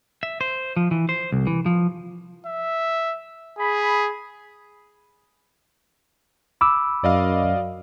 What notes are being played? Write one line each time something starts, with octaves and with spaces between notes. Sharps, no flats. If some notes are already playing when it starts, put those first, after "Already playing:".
E5
C5
F3
E3
C5
C2
E3
F3
E5
G#4 B5
B5 D6 E6
F#2 D5 D#5 F5